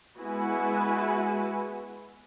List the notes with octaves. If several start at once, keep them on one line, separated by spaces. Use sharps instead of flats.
G#3 B3 E4 F#4 B4 G#5